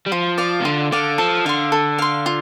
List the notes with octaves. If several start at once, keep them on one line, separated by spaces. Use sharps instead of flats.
G3
F3 F4
D5 F5
C3
D3 F4
D3 D5 F5
F3 A4
D3 F5 C6
A4
F5 C6
F4